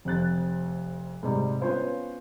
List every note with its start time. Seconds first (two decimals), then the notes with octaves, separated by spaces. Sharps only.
0.05 F1 F2 F#6 A6
1.23 G#2 C3 G3
1.61 B3 C#4 F4 C5 C#5 F5